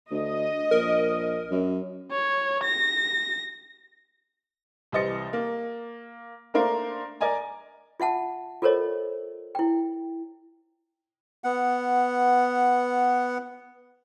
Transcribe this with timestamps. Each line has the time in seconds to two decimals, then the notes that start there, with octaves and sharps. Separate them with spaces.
0.11 D2 D#5
0.71 A#1 A#4
1.51 F#2
2.12 C#5
2.64 A#6
4.92 C2 E3 C5 D#5 A6 C#7
5.33 A#3
6.54 A3 A#3 D4 A#4 C5 F5
7.21 A#4 D5 D#5 G#5 A#5
8.00 F4 E5 F#5 A5
8.62 F4 A4 A#4 C5 C#5 D#5
9.55 E4 G5
11.44 B3 F#5